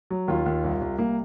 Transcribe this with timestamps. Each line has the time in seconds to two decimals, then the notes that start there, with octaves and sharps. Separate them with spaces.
0.10 F#3
0.28 D#2 F4
0.46 D#2
0.64 C2
0.81 C2
0.98 C2 A#3